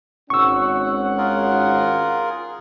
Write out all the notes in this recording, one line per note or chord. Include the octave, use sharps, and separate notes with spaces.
G#1 C#4 F#5 C#6 E6
F4 G#4 A#4